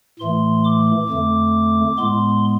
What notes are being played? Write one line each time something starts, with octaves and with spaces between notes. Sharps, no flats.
A2 E3 A3 C6
D6
F2 D3 A3
A2 G#3 B3 C6